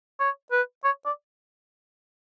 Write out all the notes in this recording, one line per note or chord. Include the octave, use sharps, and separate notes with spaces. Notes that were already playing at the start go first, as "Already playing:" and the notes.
C#5
B4
C#5
D5